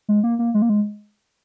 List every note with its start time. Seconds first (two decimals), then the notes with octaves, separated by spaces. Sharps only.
0.08 G#3
0.24 A#3
0.39 A#3
0.54 G#3
0.62 A#3
0.69 G#3